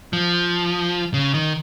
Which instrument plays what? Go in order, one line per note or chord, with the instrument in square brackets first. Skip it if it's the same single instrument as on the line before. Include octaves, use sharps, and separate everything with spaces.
[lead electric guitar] F3
C#3
D#3